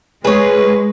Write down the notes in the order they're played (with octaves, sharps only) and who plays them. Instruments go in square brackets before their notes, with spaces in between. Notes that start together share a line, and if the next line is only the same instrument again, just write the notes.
[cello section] G#3 [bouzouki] G#4 C#5 [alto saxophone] B4